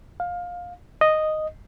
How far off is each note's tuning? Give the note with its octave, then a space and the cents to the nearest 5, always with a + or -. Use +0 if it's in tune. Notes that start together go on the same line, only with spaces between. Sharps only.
F5 +20
D#5 -5